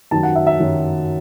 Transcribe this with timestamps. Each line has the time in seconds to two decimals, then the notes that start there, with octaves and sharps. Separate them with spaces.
0.11 F#2 D#3 F#3 A5
0.23 F#5
0.35 E5
0.47 E5
0.59 F#2 D#3 F#3